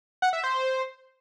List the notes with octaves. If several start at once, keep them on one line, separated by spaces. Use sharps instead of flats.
F#5
E5
C5